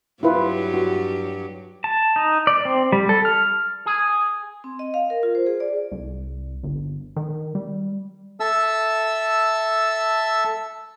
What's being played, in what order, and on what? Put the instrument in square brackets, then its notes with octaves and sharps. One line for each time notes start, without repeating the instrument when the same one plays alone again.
[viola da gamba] G2 F#3 G4 [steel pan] E4 F4 B4
[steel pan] F#4
[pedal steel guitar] A5
D#4
D5
C4
G3
A4
F6
[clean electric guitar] G#4
[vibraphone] C4
D#5
F5
A#4
F4
C5
G#4
D5
[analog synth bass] C2
G1
D#3
G3
[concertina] A4 E5 A5 E6